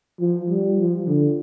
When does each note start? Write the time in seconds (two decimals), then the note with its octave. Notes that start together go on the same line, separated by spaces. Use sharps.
0.20 F3
0.50 G3
0.79 F3
1.07 D3